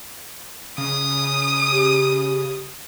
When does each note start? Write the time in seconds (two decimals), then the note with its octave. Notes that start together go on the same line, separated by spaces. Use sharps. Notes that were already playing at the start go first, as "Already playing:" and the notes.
0.78 C#3 D#6
1.72 G4